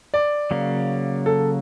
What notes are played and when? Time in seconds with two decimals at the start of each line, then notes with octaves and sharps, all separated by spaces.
0.14 D5
0.51 C#3 F#3 A#3
1.26 A4